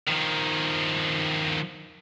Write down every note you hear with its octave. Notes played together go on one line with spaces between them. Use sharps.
D#3 F3